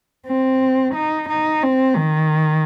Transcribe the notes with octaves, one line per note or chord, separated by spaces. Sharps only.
C4
D#4
D#4
C4
D#3